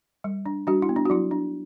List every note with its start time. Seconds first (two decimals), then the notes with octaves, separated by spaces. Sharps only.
0.24 G3
0.46 D4
0.67 G3 D4 F#4
0.82 E4
0.89 B3
0.96 D4
1.05 F#4
1.10 F#3 E4
1.31 D4